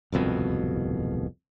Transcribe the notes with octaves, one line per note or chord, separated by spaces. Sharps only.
D1 C2 F2 B2